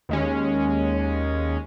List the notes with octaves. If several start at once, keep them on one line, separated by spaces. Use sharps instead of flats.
D#2 G#3 C#4